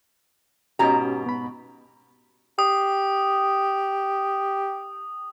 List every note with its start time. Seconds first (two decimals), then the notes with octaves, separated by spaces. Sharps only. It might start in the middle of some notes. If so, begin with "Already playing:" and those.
0.79 G#2 B2 C#4 F#4 G4 A#5
1.26 B3 B5
2.59 G4 D#6